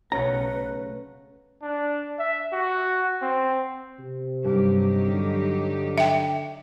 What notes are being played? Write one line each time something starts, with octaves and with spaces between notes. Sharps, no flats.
B1 C#3 A3 B4 F#5 A#5
D4
E5
F#4
C4
C3
G2 F#3 D#4 G4
D3
E5 G5